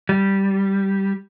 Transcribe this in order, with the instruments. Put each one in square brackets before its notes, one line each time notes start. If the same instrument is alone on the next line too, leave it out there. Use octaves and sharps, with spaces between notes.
[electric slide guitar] G3